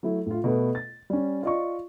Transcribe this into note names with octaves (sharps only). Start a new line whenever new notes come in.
F#3 A3 E4
A2 F4
B2 A3 B3
A6
G3 C#4
F4 D5 D#5 C#6